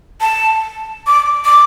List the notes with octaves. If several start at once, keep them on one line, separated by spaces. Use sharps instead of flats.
A5
D6
D6